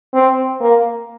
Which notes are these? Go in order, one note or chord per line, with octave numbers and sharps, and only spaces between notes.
C4
A#3